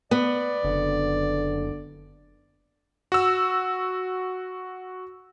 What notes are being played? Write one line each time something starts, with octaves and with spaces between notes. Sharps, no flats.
B3 D5
F#1 D3
F#4 E6